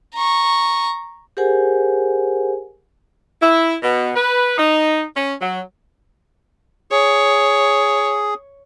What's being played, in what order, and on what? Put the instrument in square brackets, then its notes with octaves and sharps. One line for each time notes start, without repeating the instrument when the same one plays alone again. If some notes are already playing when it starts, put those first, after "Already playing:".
[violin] A#5 C#6
[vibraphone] G4 G#4 A#4 C5 F#5 G#5
[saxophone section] E4
B2
B4
D#4
C#4
F#3
[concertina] G#4 [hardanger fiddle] C#5